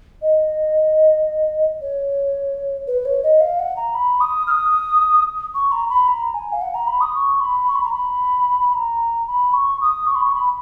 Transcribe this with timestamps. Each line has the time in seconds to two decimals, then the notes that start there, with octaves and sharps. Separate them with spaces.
0.22 D#5
1.81 C#5
2.87 B4
3.05 C#5
3.23 D#5
3.40 F5
3.59 F#5
3.76 A#5
3.94 B5
4.20 D#6
4.47 F6
4.51 D#6
5.54 C#6
5.72 A#5
5.89 B5
6.08 A#5
6.34 G#5
6.52 F5
6.61 F#5
6.74 A#5
6.87 B5
7.01 D#6
7.15 C#6
7.40 B5
7.68 C#6
7.75 B5
7.84 A#5
7.92 B5
8.69 B5
8.75 A#5
9.27 B5
9.53 C#6
9.81 D#6
10.07 C#6
10.15 B5
10.22 C#6
10.34 B5